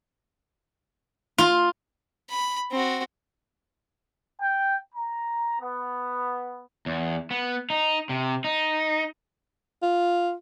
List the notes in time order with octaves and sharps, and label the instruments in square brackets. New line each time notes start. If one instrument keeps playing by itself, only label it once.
[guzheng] F4
[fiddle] B5
C4 F#4
[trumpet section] G5
A#5
B3
[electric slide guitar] E2
B3
D#4
C3
D#4
[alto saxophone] F4